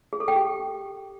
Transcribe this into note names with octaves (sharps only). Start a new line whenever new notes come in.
G#4
A4
G5
G4